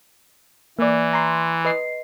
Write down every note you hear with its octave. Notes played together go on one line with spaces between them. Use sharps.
E3 A#3 D5
A#5 C6
B4 D#5 C7